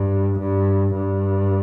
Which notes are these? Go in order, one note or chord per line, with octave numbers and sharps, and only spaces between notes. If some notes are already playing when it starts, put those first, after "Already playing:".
Already playing: G2
G2
G2